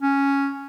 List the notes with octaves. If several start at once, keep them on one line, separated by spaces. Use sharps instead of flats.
C#4